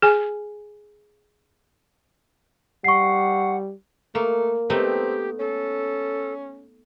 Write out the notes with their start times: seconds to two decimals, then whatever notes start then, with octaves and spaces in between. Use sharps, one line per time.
0.02 G#4 G#5
2.84 G3 F#5 C#6 C7
4.15 A3 A#3
4.70 A3 B3 C4 D#4 G4
5.39 C#4 A4